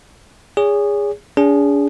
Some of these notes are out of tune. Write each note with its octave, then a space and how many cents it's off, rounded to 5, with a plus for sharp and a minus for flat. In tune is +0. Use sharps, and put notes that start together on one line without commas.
G#4 -20 C#5 +40
D4 -40 G#4 -15